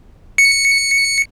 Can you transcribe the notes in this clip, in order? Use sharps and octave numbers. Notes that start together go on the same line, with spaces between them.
C#7